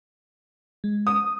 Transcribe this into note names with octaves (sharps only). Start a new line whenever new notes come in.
G#3
D#6